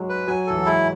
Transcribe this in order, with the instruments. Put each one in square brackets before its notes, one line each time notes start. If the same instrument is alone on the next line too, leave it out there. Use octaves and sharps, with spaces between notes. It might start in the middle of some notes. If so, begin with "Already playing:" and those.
Already playing: [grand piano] F#3 G#3
[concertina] B4
[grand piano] F#3 [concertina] G#5
[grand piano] E3 [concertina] A4
[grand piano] F#3
[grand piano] G#3 [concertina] E4